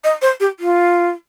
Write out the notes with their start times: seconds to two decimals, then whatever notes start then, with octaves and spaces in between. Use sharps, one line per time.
0.04 D#5
0.22 C5
0.40 G4
0.59 F4